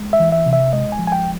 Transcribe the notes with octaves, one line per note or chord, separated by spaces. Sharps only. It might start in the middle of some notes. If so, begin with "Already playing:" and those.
Already playing: G#3
E5
E3
E5
C3
E5
G#3 D#5
G#5
F3
G#5
G5